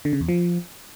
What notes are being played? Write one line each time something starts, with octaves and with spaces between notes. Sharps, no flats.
D3
C#3
E2
F3